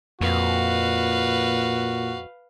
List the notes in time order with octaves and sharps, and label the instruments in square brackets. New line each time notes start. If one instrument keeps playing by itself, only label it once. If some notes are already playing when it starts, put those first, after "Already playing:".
[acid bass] F2 [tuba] A#2 [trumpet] F#4 [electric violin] B4 F5